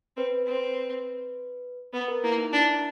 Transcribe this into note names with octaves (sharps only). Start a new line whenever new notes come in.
C4 B4
C4
B3 B4
A#4
A#3 E4
D#4
D4 E4